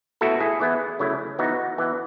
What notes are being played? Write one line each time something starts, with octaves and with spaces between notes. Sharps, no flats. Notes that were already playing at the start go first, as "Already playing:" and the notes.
B2 A3 E4 F#4 A4
E4 G#4
E3 B3 E4
C#3 F#3 A3 E4
E3 B3 D#4 F#4
E3 B3 E4